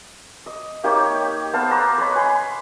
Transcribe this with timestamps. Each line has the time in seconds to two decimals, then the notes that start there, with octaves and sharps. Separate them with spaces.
0.46 D#5
0.83 A#3 D#4 G4 C#5
1.53 B3 C5 F5 A5
1.71 F#5 A#5 C6 D6
1.98 B4 C#5 D#5 B5
2.16 G#5 B5 C6